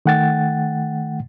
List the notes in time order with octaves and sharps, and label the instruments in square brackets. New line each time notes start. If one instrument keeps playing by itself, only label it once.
[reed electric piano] D#3 A3 F#5 G5 A6